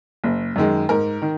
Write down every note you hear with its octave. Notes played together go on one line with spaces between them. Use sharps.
F#1
F#2 D#3 G#3
G#2 A#4
D#3